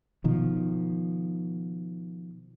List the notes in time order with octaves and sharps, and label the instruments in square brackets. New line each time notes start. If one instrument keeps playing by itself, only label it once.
[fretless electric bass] B2 D#3 F3